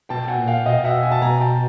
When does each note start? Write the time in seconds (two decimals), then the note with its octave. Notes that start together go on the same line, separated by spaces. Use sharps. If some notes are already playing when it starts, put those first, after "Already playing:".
0.09 B2 G5 A5
0.24 G5
0.28 F#5 G#5
0.38 A#2
0.47 F5 G5
0.66 B2 D#5 F5
0.85 E5 F#5
1.03 G#5
1.12 A5
1.22 B2 G#5 A#5
1.41 G5 A5